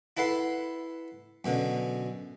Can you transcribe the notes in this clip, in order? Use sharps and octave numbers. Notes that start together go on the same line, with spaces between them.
E4 A4 B4 F#5 C6
F#2 B2 D3